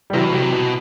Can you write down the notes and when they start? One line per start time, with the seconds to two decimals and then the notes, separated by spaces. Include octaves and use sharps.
0.10 G3
0.14 C3 E3 F#3
0.24 B2
0.34 C3
0.53 B2